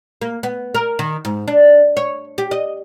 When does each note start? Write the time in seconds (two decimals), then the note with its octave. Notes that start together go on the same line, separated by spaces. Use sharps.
0.22 A#3
0.43 B3
0.75 A#4
0.99 D#3
1.25 G#2
1.48 D4
1.97 C#5
2.38 G4
2.51 D#5